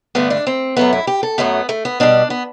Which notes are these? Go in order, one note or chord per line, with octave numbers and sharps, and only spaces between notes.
G2 D3 A3 B3
D4
C4
F#2 F#3 A3 B3
E4
G4
A4
F#2 F#3 A3 B3
A3
B3
B2 G3 D4
B3